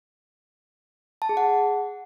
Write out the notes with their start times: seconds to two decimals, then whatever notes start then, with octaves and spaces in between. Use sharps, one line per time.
1.22 A5
1.29 G#4
1.37 F#5